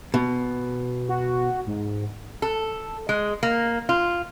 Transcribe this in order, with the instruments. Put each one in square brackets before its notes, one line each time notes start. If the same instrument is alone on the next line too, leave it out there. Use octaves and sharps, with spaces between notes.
[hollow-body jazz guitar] B2
[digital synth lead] F#4
G#2
[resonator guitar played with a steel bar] A4
G#3
A#3
F4